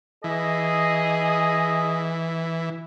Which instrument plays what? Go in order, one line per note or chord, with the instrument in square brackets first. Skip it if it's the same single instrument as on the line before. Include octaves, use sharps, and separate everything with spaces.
[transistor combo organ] E3 [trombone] G#4 [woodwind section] D#5